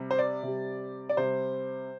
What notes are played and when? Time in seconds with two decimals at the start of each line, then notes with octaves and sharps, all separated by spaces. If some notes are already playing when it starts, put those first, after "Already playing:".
Already playing: C3 G3
0.11 C5
0.19 D5
0.43 C3 G3
1.09 D5
1.17 C3 G3 C5